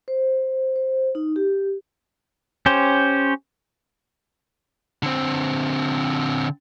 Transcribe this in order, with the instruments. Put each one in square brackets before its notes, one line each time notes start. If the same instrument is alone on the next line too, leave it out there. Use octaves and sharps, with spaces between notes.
[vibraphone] C5
C5
D#4
G4
[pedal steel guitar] C#4 G4 C5
[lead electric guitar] D3 C4